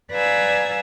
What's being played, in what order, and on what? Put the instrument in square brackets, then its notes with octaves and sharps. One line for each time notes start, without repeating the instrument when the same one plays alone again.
[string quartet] B4 D5 F5 G#5 A#5 E6